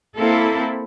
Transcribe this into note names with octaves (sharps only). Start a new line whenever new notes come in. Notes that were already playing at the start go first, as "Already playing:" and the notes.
A#3 C4 E4 A4